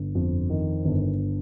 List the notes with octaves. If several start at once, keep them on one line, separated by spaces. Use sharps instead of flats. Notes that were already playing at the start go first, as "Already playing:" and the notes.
Already playing: G1
F2
D#3
G1